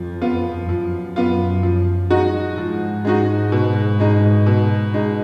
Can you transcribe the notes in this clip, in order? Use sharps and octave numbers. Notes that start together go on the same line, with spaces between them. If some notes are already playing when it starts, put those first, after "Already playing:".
Already playing: F2 F3
B3 F4
F#2 F3
B3 F4
F3
G#3 D#4 F#4
G#2 F3
G#3 D#4 F#4
B2
G#3 D#4
B2
G#3 D#4